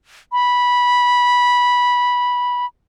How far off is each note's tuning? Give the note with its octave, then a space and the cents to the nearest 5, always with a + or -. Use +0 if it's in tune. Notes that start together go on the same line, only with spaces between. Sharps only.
B5 -15